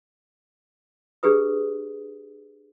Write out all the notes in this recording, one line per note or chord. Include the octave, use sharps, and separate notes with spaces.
D4 G4 G#4 B4 D#6